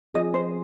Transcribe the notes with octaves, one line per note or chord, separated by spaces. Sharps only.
F3 C4 F4 G#4 D#5
C5